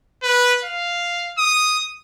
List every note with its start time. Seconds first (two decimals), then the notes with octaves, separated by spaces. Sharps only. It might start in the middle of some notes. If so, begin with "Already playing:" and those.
0.23 B4
0.64 F5
1.38 D#6